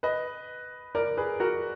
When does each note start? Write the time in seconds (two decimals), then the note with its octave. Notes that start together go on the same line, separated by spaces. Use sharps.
0.03 B4 D#5
0.95 A#4 D5
1.17 G#4 B4
1.40 F#4 A#4